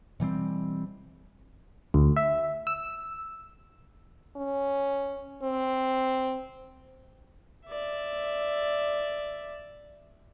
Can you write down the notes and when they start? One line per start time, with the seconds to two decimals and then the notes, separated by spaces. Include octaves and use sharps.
0.20 B2 E3 G3 C4
1.94 D2
2.16 E5
2.67 E6
4.36 C#4
5.43 C4
7.66 D5 E5